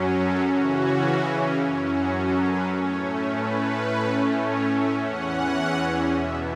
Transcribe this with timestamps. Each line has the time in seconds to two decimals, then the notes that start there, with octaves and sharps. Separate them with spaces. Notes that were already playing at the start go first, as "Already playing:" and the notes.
Already playing: F#2 F#3 C#4
0.18 A4
0.45 C#3 E3 C#4 F#4
1.59 F#2 F#3 C#4 E4
1.88 F#4
2.16 A4
2.45 B4
2.73 A2 A3 C#4 C#5
3.01 E5
3.30 B4
3.87 A2 A3 C#4
4.44 C#5
4.72 E5
5.00 E2 E3 C#4 F#5
6.14 E2 B2 B3 E5